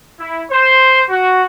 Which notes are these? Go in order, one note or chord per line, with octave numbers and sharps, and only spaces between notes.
E4
C5
F#4